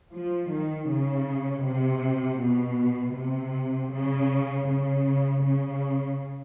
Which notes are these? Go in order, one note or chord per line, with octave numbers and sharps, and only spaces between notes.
F3
D#3
C#3
C3
B2
C3
C#3
C#3
C#3